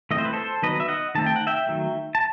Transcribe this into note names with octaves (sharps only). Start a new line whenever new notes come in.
E3 A3 C4 D#5
C5
B4
A4 C5
D#3 F#3 B3 B4 D#5
E5
D#5 F#5
D#3 A3 C4 A5
G5
F#5
E5 G5
D#3 F#3 A3
A5